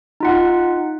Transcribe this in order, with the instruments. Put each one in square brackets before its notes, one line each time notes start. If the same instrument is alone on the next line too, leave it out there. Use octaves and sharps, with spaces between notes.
[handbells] D#4 F4 F#5